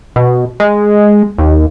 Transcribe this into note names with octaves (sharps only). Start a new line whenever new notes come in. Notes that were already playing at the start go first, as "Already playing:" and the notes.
B2
G#3
D#2